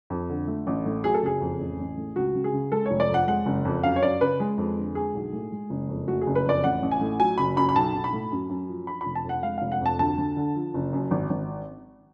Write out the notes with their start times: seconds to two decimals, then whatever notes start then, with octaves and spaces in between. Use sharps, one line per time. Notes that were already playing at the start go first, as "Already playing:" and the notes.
0.10 F2
0.30 D3
0.48 A3
0.67 A1
0.86 A2
1.04 F#3 G#4
1.14 A4
1.22 F#1 G#4
1.41 F2
1.60 A1
1.79 A1
1.98 A2
2.16 C#2 F#4
2.34 C#2
2.44 G#4
2.53 C#3
2.72 G#3 A4
2.86 C#5
2.91 F1
3.00 D5
3.09 F2
3.14 F#5
3.28 G#3 F#5
3.46 F#1
3.65 F2
3.83 F#2 F5
3.96 C#5
4.03 F#2 D5
4.21 C#3 B4
4.40 G#3 G#4
4.58 F2
4.77 D3
4.95 G#3 G#4
5.15 B1
5.33 A2
5.52 G#3
5.70 F#1
5.89 F2
6.08 A3 F#4
6.21 G#4
6.27 F#1
6.35 B4
6.45 F2 D5
6.64 A1 F#5
6.82 A1
6.91 G#5
7.01 A2
7.20 F#3 G#5
7.38 F#1 B5
7.56 F#2 B5
7.69 B5
7.76 B1 A5
7.95 B1
8.04 B5
8.13 A2
8.32 F#2
8.50 F#2
8.69 F3
8.87 F3 B5
9.01 F1 B5
9.15 A5
9.25 F2 F#5
9.43 G#3 F5
9.58 F1 F5
9.72 F#5
9.81 F2 A5
9.99 D2 A5
10.18 D2
10.37 D3
10.55 F3
10.74 F#1
10.93 F#2
11.11 G#1
11.30 G#1